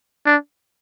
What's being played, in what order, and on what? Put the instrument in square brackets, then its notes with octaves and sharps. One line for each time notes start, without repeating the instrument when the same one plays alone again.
[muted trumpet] D4